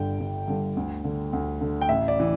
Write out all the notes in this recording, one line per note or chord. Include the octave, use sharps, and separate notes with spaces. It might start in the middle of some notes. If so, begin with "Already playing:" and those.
Already playing: G1 G2 D3 G5
G1
G2 D3
D2
D3
D2
D3
G5
A1 E5
D5
E3